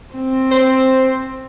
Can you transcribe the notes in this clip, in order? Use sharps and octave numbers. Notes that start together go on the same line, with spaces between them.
C4
C5